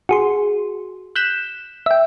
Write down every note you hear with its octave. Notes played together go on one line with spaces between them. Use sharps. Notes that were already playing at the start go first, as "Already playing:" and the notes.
F#4 G#4 C6
F#6 G6 B6 E7
E5 G5